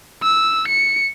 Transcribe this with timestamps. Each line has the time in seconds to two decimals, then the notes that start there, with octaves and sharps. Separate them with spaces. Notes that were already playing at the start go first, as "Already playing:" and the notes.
0.23 E6
0.68 C#7